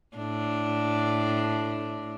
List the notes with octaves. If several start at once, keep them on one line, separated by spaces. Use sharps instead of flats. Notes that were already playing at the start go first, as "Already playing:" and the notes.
A2 D4